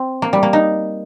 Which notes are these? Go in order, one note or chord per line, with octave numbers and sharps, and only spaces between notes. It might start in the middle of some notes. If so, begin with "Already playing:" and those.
Already playing: C4
A#3
G3
A#3
D#4